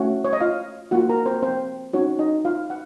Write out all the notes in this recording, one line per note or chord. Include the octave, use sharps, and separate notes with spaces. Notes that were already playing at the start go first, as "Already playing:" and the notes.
Already playing: A3 C#4 F#4
C#5
D#5
F4 F5
A#3 F4 F#4 F#5
A#4 A#5
C4 C5
C4 C5
C4 C#4 D#4 F#4 C#5
D#4 D#5
F4 F5
F#5